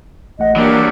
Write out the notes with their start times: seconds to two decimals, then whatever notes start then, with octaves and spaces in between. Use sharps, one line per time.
0.39 A1 A3 D#5 F#5
0.56 E3 F#3 G3 A#3 D4